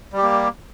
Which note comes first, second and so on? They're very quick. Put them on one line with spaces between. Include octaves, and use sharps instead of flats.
G3 G4 A#3